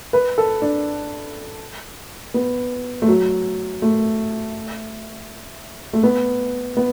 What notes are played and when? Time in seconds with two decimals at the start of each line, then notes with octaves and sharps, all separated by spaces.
0.13 B4
0.38 A4
0.62 D4
2.34 B3
3.02 A3
3.08 F#3
3.82 A3
5.93 A3
6.03 B3
6.77 B3